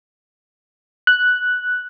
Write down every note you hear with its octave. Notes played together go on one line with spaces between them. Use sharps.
F#6